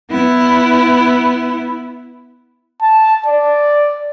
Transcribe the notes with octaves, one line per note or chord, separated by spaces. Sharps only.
B3 E4
A5
D5